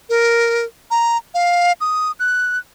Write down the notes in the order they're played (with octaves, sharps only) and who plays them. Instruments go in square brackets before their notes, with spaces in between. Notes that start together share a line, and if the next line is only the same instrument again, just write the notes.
[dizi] A#4
A#5
F5
D#6
F#6